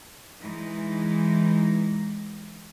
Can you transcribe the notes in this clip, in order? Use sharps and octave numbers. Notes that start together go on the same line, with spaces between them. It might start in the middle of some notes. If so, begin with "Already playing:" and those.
E3 G#3 D#4